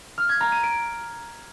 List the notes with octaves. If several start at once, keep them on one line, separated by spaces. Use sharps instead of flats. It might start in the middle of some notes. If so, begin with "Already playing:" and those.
F6
G#6
A#5
D#7
D7